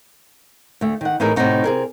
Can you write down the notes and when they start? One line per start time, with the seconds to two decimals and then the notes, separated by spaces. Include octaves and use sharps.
0.81 D2 A3
1.01 D#3 F#5
1.20 A2 E3 D#4 G#4 A#4
1.36 A2 C3 D#3 F#3 D#4 F#4
1.64 C3 G#4 A#4